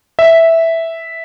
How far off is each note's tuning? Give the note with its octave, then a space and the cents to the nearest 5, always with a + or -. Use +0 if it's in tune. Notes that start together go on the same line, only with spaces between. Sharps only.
E5 -5